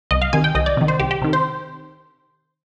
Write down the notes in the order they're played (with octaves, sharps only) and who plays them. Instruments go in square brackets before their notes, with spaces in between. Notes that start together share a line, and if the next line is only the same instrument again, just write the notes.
[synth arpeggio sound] C2 D#5
F5
C3 D#3 G#5
G5
C2 D#5
D5
C3 D#3
C5
C2 G4
G4
C3 D#3
C5